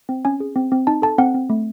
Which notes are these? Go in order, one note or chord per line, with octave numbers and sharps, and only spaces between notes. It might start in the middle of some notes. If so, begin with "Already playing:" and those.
C4
C#4 G#5
G#4
C4
C4
D#4 A5
A4 A5
C4 F#5
C4
A3